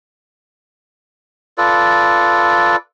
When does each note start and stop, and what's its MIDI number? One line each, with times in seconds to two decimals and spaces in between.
1.58 2.76 65
1.58 2.76 69
1.58 2.76 71
1.58 2.76 74